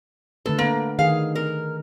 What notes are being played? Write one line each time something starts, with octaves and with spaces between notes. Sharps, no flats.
D3 A3 A4 B4
D3 A#3 B4
D#3 G#4 F5
A#4